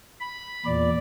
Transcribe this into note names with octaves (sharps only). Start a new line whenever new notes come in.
B5
E2 A#2 D5